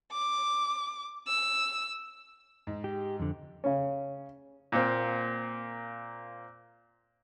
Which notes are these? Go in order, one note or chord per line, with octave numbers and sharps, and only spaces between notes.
D6
E6
G#2
G4
F2 D3
C#3 C#4
A#2 A#3 C4